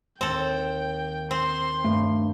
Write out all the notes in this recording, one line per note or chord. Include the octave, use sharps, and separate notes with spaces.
D#2 C4 A4 G5
C4 C6
G2 A3